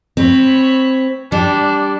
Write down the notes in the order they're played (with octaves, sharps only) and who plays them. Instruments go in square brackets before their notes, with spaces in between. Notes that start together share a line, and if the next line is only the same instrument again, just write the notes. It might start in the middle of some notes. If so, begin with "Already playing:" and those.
[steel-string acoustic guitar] C4 [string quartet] C#5 B5
[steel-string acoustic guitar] G3 [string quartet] D4